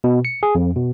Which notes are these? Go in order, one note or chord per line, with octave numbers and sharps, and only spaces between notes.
B2
C#7
G#4
F2
B2